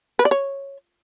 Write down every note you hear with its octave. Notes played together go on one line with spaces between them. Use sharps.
B4
D5
C#5